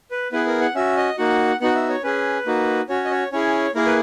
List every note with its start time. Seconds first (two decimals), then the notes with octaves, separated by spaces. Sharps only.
0.11 B4
0.32 B3 E4 G#4 B4
0.47 A#4
0.61 F#5
0.75 C#4 F#4 E5
0.97 D#5
1.18 A#3 D#4 F#4 F#5
1.60 B3 D#4 F#4 F#5
1.75 E5
1.89 C#5
2.04 C#4 G#4 B4
2.46 A#3 D#4 F#4
2.89 C#4 F#4 C#5
3.05 D#5
3.11 C#5
3.32 C#4 E4 G#4 C#5
3.75 A#3 E4 G#4 A#4
3.86 B4